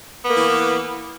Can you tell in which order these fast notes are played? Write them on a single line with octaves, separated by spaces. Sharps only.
B3 A#3 E3